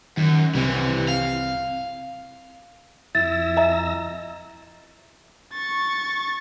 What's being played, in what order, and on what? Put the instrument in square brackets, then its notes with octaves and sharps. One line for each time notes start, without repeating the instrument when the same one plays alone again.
[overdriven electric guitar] F#2 [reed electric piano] D#3
[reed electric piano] C2 C4 [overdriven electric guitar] C3 E3
[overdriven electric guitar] F5
[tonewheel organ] F2 E6 A#6 [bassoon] E4 [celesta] A6
[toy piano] D#5 E5 A#5
[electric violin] C#6 A6